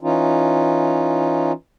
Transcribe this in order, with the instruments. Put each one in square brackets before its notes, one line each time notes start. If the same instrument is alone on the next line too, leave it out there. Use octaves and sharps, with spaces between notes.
[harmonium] E3 C#4 D#4 F4